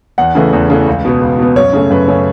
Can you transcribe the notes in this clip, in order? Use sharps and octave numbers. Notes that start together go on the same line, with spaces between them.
E2 F#5
C#3 E3 A3
E2
C#3 E3 A3
C#2
B2 B3
C#2
B2 B3
F#2 C#5
C#3 A3 C#4
F#2 B4
C#3 A3 C#4